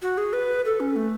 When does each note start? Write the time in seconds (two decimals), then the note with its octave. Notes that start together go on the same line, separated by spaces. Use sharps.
0.02 F#4
0.17 G#4
0.33 B4
0.65 A4
0.80 C#4
0.96 A3